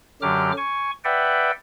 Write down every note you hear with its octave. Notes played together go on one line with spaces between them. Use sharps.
F#2 D3 F#3 G4 D6 F6
G#5 C#6
B4 D5 E5 F#5 G5